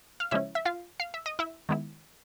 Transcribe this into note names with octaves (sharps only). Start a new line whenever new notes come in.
F5
C#3 F3 G#3 C#4 E4 E5
E5
F4 F5
F5
E5
D#5
E4 E5
D#3 G#3 B3 E4